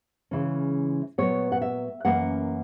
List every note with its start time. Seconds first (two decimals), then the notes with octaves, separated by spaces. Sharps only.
0.31 C#3 E3 G#3 C#4
1.18 A#2 F#3 B3 C#5
1.52 F#5
1.62 E5
2.05 F#2 E3 A#3 C#4 F#5